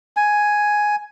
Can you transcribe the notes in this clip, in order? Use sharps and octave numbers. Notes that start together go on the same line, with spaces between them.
G#5